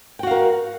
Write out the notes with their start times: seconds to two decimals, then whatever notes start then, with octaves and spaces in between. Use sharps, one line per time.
0.19 G5
0.23 F#4
0.27 F5
0.31 A#4